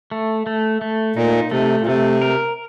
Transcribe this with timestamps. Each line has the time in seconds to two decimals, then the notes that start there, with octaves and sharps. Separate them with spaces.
0.12 A3
0.47 A3
0.81 A3
1.16 A#2 D#4
1.51 C3 A3
1.81 A#2
1.86 C3 A3
2.22 A#4